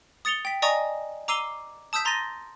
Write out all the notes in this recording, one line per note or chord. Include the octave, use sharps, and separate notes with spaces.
D#6 A6 C#7 F7 G7
G5 B6
D5 D#5 G#5 A#5 C#6 D#6
A#5 D6 E6 C7 D#7 G7
A5 D#6 E6 G6 B6
A#5 C6 A6 A#6 D#7